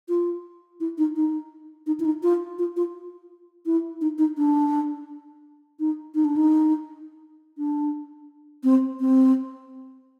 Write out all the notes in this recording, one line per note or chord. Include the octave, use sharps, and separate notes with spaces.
F4
E4
D#4
D#4
D#4
E4
D#4
F4
F4
F4
E4
D#4
D#4
D4
D#4
D#4
D4
D#4
D4
C4
C4